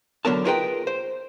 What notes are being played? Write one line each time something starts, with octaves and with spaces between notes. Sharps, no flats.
D3 F#3 B3 A#4 A5
F4 G#4 A#4 B4 D#5 G5
C5